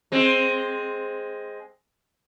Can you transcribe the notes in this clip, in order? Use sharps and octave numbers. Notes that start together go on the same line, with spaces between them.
G#3 C4